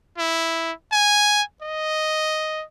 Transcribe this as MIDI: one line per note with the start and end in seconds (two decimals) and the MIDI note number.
0.18 0.72 64
0.92 1.43 80
1.62 2.64 75